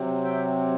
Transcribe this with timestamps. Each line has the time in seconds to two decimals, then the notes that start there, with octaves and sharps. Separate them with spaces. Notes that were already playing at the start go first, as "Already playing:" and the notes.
Already playing: C3 F#3 C4
0.24 E5 G5